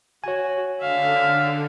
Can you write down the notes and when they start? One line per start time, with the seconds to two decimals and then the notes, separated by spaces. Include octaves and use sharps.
0.24 F#4 C#5 G#5
0.80 D3 E5 F5